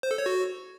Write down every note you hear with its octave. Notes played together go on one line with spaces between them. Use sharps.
C5
A4
C#5
F#4